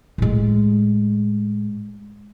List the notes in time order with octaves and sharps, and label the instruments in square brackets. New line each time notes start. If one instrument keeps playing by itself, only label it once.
[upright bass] A2 G#3